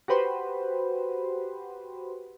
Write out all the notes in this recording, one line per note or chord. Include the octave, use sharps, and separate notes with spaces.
F#4 G4 B4 C5